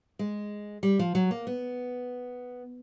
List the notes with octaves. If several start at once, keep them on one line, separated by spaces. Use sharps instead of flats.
G#3
G3
F3
F#3
A#3
B3